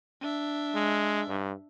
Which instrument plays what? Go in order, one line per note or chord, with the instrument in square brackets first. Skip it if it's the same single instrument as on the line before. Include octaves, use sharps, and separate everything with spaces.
[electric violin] D4 E5
[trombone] G#3
G2